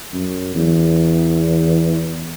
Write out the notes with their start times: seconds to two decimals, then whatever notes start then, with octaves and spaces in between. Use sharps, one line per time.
0.13 F#2
0.54 E2